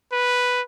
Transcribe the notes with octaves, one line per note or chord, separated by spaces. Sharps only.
B4